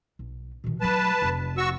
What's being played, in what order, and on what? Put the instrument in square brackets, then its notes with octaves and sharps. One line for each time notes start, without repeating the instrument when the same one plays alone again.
[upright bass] B1
B2 D#3
[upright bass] F#3 A3 [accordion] B4 A5
[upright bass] F1
[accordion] F#4 C#6 E6